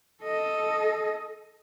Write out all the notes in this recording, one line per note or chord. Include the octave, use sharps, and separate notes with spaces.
A4 D#5